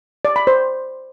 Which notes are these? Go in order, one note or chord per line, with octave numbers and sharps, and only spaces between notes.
D5
B5
C5